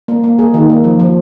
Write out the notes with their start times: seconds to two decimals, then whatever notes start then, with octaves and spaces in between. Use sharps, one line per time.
0.08 A#3
0.24 A#3
0.39 A#3 G#4
0.54 D#3
0.69 A#3
0.84 F3
0.99 F3